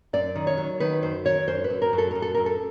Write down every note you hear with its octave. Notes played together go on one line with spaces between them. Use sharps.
F#2 D5
D#3
C#5
F#3
D#3 B4
F#2 C5
D#3 C#5
F#2 C5
B4
F#2
A#4
F#2
A4
F#2 A#4
A4
F#2 A#4
A4